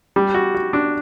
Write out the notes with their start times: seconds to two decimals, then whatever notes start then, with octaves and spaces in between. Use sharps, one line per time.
0.16 G3
0.34 F#4
0.54 F#4
0.73 D4